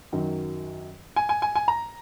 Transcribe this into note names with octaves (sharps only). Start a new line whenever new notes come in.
F#2 D#3 F#3
G#5
G#5
G#5
G#5
A#5